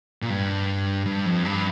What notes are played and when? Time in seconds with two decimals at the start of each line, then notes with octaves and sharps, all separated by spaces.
0.22 A#2
0.30 G2
1.06 G2
1.26 F2
1.45 G2